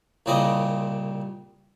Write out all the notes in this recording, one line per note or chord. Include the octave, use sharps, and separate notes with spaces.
C2 A#2 C#3 C4 D5 D#5